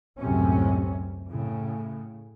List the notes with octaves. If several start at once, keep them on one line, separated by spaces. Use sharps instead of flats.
C#2 F#2 A2 C3 C#4
A2 C#3